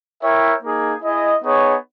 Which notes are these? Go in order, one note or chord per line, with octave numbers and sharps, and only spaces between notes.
E4 A#4 C#5 E5 G5
A#3 D#4 G#4
E4 G#4 D#5
B3 D#4 G#4 C#5